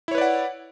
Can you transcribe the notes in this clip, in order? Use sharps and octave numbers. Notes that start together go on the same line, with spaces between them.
E4 B4 C#5 D5 F#5